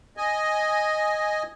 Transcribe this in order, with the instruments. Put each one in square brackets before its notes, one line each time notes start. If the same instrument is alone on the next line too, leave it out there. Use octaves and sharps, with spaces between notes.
[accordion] D#5 G#5